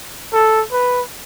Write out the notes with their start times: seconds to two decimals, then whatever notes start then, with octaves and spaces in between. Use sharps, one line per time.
0.33 A4
0.72 B4